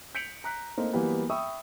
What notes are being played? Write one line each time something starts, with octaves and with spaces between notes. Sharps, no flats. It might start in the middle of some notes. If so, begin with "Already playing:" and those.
G6 B6 C#7 D7 F7 F#7
A#5 F#6 B6
A3 A#3 C4 D#4
E3 F#3 G3 A#3 B3
E5 G5 B5 C#6 D#6 E6